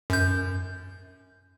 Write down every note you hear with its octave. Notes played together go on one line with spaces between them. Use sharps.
F#2 G6